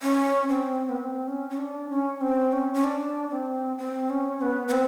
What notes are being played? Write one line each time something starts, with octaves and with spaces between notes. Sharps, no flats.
C#4
C4
B3
C4
C#4
C#4
D4
C#4
C4
C#4
C#4
D4
C4
C4
C#4
B3
B3
C4